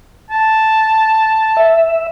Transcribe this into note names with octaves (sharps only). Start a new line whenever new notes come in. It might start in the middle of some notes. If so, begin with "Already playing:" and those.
A5
E5